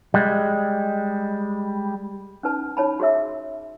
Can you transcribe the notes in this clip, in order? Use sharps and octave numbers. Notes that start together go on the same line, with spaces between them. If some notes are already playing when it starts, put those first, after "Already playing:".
G3 G#3
C#4 D#4 B4 A5
D#4 C#5 A5 B5
F#4 G#4 C#5 E5 E6